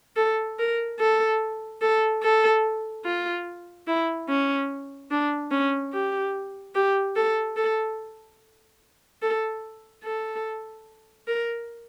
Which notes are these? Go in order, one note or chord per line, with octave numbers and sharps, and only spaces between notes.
A4
A#4
A4
A4
A4
F4
E4
C#4
D4
C#4
G4
G4
A4
A4
A4
A4
A#4